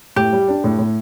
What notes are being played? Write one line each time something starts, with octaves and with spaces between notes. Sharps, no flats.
A2 G4
G3
D4
A2
A2